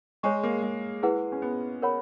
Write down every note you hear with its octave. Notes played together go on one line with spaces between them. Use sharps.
G#3 G#4 C#5 G#5 C#6
A#3
G#3
E4 G#4 B4 F#5
C#4
B3
A#4 C#5 F#5 B5